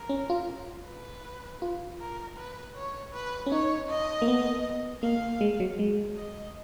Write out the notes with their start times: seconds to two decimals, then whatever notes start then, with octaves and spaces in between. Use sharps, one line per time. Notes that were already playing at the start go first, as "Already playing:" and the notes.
Already playing: A#4
0.09 C#4
0.30 F4
0.86 B4
1.62 F4
2.00 A#4
2.37 B4
2.76 C#5
3.14 B4
3.46 C#4
3.52 D#4 C#5
3.90 D#5
4.22 A#3
4.28 B3
5.03 A#3 F5
5.41 G#3
5.60 F#3
5.79 G#3
6.17 D#5